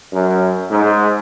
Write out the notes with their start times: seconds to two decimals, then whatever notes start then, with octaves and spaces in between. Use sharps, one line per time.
0.13 F#2
0.70 G#2